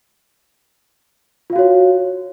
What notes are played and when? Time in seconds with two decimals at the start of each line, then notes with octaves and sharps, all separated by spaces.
1.50 F4
1.53 F5
1.56 F#4
1.59 C#5